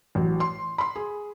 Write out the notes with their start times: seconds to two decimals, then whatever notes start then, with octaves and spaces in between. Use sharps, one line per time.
0.15 A1 F#3
0.40 C6
0.78 B5 C6
0.96 G#4